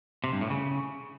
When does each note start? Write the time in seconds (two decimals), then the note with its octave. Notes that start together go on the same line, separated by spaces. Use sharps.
0.24 C3
0.33 G2
0.41 A2
0.50 C#3